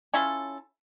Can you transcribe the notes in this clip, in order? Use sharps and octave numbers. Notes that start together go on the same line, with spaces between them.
C#4 E4 F4 A4